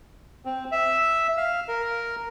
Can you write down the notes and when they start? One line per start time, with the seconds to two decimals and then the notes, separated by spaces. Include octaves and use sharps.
0.45 C4
0.72 E5
1.37 F5
1.68 A#4